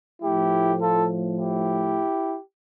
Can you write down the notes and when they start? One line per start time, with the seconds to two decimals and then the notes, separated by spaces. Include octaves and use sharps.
0.22 A2 F3 A3 E4 G4
0.80 F4 A4
1.37 E4 G4